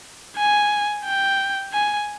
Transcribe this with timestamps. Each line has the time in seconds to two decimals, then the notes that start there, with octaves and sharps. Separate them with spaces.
0.37 G#5
1.05 G5
1.73 G#5